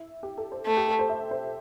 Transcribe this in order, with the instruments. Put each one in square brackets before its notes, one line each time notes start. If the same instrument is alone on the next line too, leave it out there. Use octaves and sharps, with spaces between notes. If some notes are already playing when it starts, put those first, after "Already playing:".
Already playing: [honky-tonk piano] E4
G4
A4
C5
[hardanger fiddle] A3
[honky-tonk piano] G4
A4
C5
E5
C5